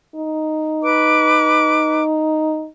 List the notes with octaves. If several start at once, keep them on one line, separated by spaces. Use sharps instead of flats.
D#4
B4 D6